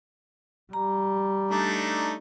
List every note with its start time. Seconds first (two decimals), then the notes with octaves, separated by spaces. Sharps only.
0.73 G3 A#5
1.51 A3 D4 D#4